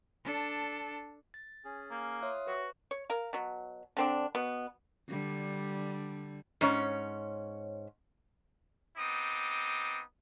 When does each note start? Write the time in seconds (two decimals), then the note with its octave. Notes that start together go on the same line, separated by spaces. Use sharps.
0.25 D4 A4
1.34 A6
1.65 C#4 G#4
1.91 A#3
2.22 F4 C#5 E5 F5 D#6 F#6
2.47 F#4 B4
2.91 C#5
3.10 A#4 F5
3.33 B2 F#3
3.97 D3 C4 D4
4.35 B2 B3
5.08 D3 G3
6.61 G#2 C#4 C#5
8.97 B3 C4 D#4 D6 D#6